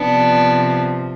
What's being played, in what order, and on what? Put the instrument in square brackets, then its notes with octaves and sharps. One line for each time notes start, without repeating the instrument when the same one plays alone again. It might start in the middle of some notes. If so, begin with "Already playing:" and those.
Already playing: [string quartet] C3 F3 B3 D4